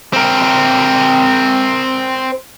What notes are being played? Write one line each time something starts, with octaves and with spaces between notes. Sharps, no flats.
C4 A#4